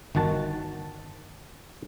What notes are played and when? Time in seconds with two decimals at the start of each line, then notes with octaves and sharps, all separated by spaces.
0.15 G1 D#3 F#4 A5